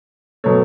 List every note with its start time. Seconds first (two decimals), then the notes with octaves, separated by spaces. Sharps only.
0.44 B2 F#3 A3 C#5